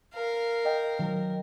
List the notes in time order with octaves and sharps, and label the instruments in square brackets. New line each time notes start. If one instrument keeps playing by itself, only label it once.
[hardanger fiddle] A#4 F5
[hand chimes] D#5 G5
[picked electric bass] D#3 F#3 [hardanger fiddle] A#4